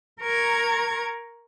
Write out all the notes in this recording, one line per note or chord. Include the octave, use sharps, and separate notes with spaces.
A#4 A#5 C#6 G#6